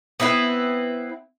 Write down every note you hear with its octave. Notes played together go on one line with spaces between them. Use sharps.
B3 C4 E4 B4